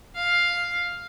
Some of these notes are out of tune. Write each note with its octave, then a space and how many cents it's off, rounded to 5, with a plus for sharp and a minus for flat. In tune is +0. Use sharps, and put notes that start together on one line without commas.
F5 +5